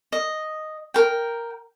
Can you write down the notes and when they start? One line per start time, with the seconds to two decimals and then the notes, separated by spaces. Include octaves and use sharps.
0.12 D#5
0.94 A#4 G5